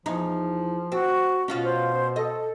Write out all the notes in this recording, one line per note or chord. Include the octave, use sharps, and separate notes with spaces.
E2 F3 D#4
C4 F#4
B2 C#4 F4 F#4
C5
A4 D#5